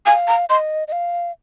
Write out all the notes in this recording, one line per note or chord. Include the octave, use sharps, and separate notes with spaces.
F5 G#5
A#5
D#5 C6
D#5
F5